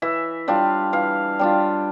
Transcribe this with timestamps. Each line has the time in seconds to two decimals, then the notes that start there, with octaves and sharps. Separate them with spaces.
0.02 E3 E5
0.48 G3 D4 F4 F5
0.93 E3 F5
1.39 G3 D4 F4